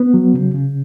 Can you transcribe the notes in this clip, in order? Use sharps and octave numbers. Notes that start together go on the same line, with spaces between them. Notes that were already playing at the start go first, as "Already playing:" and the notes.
Already playing: B3
F#3
C#3
C#3